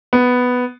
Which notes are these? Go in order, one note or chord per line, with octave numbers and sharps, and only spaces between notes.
B3